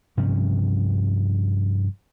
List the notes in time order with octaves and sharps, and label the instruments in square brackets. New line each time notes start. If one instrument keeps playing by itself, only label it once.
[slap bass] G2 C3 F3 C#4